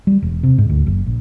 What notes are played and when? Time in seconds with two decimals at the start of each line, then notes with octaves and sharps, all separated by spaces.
0.07 G3
0.22 E1
0.43 C3
0.58 G#2
0.69 D2
0.86 F#1
1.06 A#1